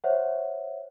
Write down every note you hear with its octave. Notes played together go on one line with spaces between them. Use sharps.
C5 C#5 E5 F#5